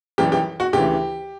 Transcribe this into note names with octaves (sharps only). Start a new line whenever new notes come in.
F#2 E3 G3 G4
G4
F#4
D2 C#3 E3 G4